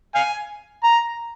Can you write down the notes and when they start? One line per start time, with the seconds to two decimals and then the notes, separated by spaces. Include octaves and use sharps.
0.15 F5 G#5
0.84 A#5